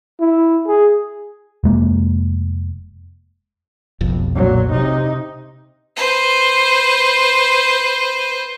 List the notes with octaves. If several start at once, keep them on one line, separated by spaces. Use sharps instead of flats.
E4
G#4
F1 G#3 A#3
F1 B1 F2
A#2 F#3
C3 D#4
B4 C5